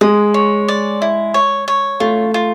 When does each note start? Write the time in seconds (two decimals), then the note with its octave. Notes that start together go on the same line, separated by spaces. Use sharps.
0.01 G#3 D#6
0.34 C#5
0.68 D5
1.02 E4
1.34 C#5
1.68 C#5
2.00 A3 F4
2.34 F4